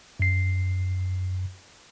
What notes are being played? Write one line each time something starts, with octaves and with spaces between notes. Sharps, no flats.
F#2 C7